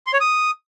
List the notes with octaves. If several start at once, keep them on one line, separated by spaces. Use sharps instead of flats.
C6
C#5
D#6